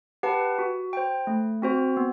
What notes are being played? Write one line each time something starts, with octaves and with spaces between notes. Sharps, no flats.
G4 B4 F#5 A5
F#4
C5 G5
A3
C4 F#4 C5
B3